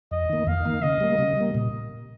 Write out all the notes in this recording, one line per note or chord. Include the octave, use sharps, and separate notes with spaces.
F2 D#5
D#3 A#3
F2 F5
D#3 A#3
C#3 D#5
G3 A#3
C#3
G3 A#3
A#2